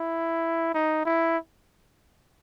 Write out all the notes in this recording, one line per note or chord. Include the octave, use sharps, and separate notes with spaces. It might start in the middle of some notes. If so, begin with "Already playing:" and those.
Already playing: E4
D#4
E4